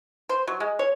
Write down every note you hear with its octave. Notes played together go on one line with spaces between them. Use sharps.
C5
F#3
G#3
C#5